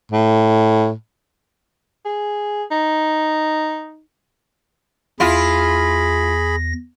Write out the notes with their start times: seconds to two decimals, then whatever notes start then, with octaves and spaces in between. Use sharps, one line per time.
0.11 A2
2.06 G#4
2.71 D#4
5.20 E2 E4 F4 G#4 B5 A#6